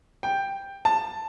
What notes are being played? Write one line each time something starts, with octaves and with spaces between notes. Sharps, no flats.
G5
A5